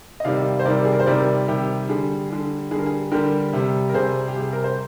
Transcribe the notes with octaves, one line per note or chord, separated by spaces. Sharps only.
D#5
C3 D#3 G3 D5 F5
C5
C3 D#3 G3 A#4 D5
G#4
A#4
C5
C3 D#3 G3 A#4 D5
C3 D#3 G3 G4
D3 G3 G#4
D3 G3
D3 G3 G#4
A#4
G#4
D3 G3 G4 A#4
C3 G3
A#4
C3 G3 G#4 C5
G4
C3 G3 G#4
A#4
C5